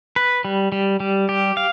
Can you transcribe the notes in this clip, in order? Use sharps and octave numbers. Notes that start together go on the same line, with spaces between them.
B4
G3
G3
G3
G4
F5